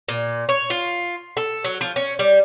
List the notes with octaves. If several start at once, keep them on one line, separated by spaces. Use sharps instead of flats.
A#2
C#5
F4
A4
F#3
F3
C#4
G3